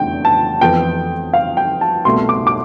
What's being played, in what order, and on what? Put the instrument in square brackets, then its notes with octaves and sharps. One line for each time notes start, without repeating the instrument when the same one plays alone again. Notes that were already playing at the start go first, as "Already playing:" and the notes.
Already playing: [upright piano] F1 E2 D3 G5
A5
F2 E3 B3 G5
F5
G5
A5
C2 B2 A3 C6
D6
D6